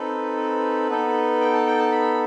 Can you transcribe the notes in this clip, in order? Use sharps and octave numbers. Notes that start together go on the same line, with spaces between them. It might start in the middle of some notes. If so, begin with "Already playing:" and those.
Already playing: C4 D#4 A4 B4
B4
B3 D#4 A4
G5
A5
G5
A5
B5